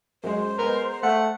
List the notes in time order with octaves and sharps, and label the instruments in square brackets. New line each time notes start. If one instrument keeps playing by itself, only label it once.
[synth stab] F#2 G#3 [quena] C5
[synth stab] G#3 B3 [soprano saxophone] A#4
[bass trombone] A3 [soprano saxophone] F#5